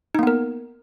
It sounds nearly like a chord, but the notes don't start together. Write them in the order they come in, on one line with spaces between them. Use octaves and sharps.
D#4 A#3 B3 A#4